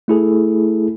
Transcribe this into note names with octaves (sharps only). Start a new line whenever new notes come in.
A3 E4 G#4 A4